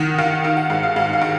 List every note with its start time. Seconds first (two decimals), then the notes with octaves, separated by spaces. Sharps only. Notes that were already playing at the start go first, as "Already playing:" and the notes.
Already playing: D#3 F#5
0.18 D#3 F5
0.44 D#3 F5
0.57 F#5
0.70 G#2 F5
0.83 F5
0.96 G#2 F5
1.13 F5
1.21 D#3